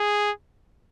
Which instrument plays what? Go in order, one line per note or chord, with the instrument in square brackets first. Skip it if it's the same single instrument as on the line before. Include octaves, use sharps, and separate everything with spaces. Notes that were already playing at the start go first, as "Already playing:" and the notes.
Already playing: [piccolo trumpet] G#4